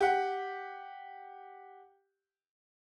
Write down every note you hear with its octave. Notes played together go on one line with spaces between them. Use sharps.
G4 F#5